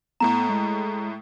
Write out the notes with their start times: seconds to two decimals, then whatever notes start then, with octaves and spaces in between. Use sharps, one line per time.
0.20 A2 A3 B3 A#5 E7
0.49 G#3